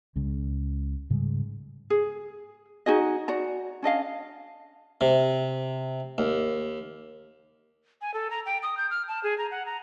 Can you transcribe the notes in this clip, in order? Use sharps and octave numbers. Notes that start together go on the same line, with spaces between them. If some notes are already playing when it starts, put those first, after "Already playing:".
C#2 C#3 G#3
G#2 C#3 G3 G#3
G#4
D#4 F#4 G#4 D#5
F#4 D5 A#5
C#4 D4 D#5 F5
C3
D#2
G#5
A4
A#5
G5
D#6
G6
F6
A5
G#4
A#5
F#5
A#5